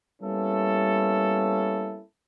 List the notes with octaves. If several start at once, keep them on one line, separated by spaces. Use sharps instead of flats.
G3 A#3 B3 C#4 E4 A4